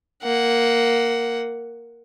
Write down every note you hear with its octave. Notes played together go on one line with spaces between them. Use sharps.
A#3 F#5